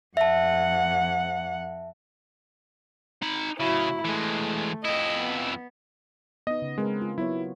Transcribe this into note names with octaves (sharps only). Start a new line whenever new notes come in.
F2 E5 F#5 A5
D#4 B5
A2 C#3 F#3 E4
E3 G#3 A3
F2 E4 D#5
B3
B3 D#4 D#5
C#3
G#3 C4 A#4 B4
F4
F#3 B3 E4 C#5